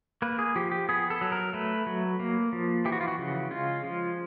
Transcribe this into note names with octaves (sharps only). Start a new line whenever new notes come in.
A#3 B4
G#4
F3 G4
G4
B3 G#4
A4
F#3
A#4
A3 B4
F#3
A#3
F3
E3 G4
F#4
F4
F#4
C#3
G#3 F4
F3